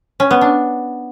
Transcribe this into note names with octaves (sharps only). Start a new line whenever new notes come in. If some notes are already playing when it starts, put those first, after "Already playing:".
C#4
B3
D4